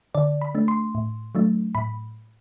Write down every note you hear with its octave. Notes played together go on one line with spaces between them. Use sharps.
D3 D5
B5
A3 D4
C6
A2
F#3 A3 D4
A2 B5